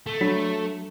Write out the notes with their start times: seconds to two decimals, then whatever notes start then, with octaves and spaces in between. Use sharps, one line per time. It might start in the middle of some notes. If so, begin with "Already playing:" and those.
0.07 A3
0.21 F#3 D4